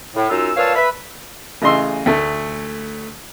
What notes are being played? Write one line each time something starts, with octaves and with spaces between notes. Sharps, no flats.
A2
F#2 D#4 F4 E6
A#2 B4 C#5 F5 A5 E6
B4 E5 B5
A1 C#3 D#5 C6 E6
D2 A3